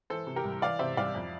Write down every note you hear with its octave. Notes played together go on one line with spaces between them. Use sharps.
E3 A4 C5
C3
G4 A#4
C2
E3 D5 F5
C3 C5 E5
C2 D5 F5
F2